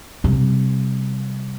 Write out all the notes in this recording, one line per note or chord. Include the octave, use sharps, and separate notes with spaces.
C3 G3